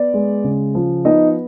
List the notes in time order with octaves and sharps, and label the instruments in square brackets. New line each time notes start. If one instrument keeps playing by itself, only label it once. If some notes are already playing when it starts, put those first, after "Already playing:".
Already playing: [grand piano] B3 D5
G#3
C#3
F3
B3 D#4 D#5